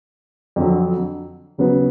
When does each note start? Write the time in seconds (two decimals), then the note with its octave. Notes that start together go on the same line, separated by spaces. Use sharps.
0.56 F2 D3 F#3
1.58 D#2 C#3 F#3 B3